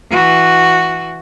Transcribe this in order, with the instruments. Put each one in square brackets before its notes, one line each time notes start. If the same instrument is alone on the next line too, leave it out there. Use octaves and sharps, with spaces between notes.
[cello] E3 F#4